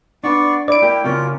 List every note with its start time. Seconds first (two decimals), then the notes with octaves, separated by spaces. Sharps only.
0.24 B3 D4 D5 C#6
0.68 E4 D5 D7
0.82 A#3 G4
1.04 C#3 A#3 C#4 F4